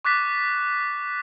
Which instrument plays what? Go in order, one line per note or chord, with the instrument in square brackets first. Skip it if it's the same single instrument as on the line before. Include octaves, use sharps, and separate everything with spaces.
[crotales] C#6 D6 F#6 A6 B6 E7